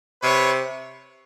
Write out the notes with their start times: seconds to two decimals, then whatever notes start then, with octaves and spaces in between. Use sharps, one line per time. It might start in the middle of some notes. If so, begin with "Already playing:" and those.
0.23 C3 B4 C#5